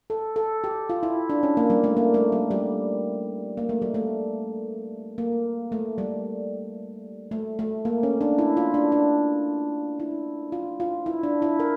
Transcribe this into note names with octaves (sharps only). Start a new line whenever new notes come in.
A4
A4
G4
F4
E4
D4
C#4
A#3
G3
A3
A#3
A3
G3
G3
A#3
A3
G3
A3
A#3
A3
G3
A3
A3
A#3
C#4
D4
E4
F4
D4
D4
E4
F4
F4
E4
D4
E4
A#4